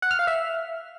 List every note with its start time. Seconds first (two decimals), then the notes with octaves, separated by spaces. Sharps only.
0.02 F#5
0.11 F6
0.19 F5
0.27 E5